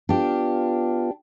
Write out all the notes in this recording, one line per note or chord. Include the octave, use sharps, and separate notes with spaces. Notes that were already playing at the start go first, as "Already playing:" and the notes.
B3 D4 F4 G4